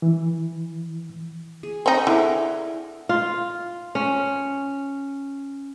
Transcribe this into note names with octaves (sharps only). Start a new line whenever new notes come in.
E3
G#4
C4 D#4 C#6
D3 E4 G#4 A#4
F4
C#4